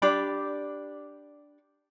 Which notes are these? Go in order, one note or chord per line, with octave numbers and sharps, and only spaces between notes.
D4 G4 D5 B5